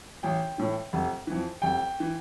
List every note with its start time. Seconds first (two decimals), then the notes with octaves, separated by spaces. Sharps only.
0.23 A1 G5
0.58 A2 E3
0.93 F1
1.27 F2 E3
1.62 F1 G5
2.00 E3